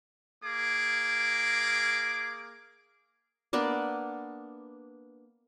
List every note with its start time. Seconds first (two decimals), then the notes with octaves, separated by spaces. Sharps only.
0.43 A#3 G#4 D6
3.53 A#3 B3 D4 D5